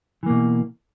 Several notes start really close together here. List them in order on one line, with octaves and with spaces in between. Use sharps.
E3 A#3 B2